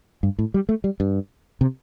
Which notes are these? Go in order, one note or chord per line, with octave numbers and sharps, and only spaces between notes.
G2
A2
G3
A3
G3
G2
C3